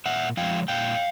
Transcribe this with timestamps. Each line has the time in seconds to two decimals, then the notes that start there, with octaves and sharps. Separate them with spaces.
0.06 A#2 E5 F#5
0.37 F3 G#3 F5 G5
0.68 A#2 F5 G5